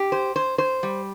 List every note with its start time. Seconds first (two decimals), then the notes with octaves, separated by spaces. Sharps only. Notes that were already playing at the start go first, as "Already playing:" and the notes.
Already playing: G4
0.12 C5
0.36 C5
0.58 C5
0.83 G3